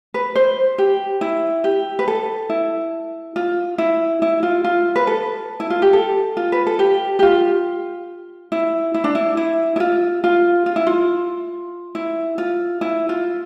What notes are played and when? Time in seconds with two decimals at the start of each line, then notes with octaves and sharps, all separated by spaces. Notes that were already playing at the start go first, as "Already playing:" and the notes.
0.14 B4
0.36 C5
0.78 G4
1.21 E4
1.64 G4
1.99 B4
2.08 A4
2.50 E4
3.36 F4
3.78 E4
4.22 E4
4.43 F4
4.64 F4
4.96 B4
5.07 A4
5.60 E4
5.70 F4
5.82 G4
5.93 A4
6.37 F4
6.52 B4
6.67 A4
6.79 G4
7.19 G4
7.22 F4
8.52 E4
8.94 E4
9.04 D4
9.15 E4
9.37 E4
9.76 E4
9.80 F4
10.24 F4
10.66 F4
10.76 E4
10.87 F4
11.95 E4
12.38 F4
12.81 E4
13.09 F4